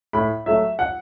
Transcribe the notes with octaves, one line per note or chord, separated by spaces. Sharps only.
A2 B5
F#3 A3 E5
F#5